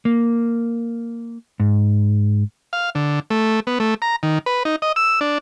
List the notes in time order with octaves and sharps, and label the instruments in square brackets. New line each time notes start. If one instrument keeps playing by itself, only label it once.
[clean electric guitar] A#3
G#2
[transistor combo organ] F5
D3
A3
B3
A3
A#5
D#3
B4
D#4
D#5
E6
D4